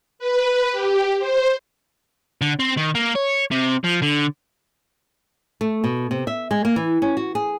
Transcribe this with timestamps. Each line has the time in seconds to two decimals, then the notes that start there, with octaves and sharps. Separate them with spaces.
0.19 B4
0.72 G4
1.19 C5
2.41 D3
2.59 C4
2.77 D#3
2.95 A#3
3.16 C#5
3.52 C3
3.84 F3
4.03 D3
5.61 A3
5.84 B2
6.11 C3
6.27 E5
6.51 G#3
6.65 A#3
6.76 E3
7.02 C#4
7.17 F#4
7.35 G#4